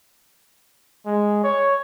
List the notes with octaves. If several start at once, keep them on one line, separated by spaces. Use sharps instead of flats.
G#3
C#5